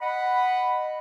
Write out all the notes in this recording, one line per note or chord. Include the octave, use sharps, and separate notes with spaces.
D#5 F#5 B5